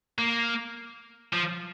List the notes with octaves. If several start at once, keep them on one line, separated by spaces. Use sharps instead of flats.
A#3
F3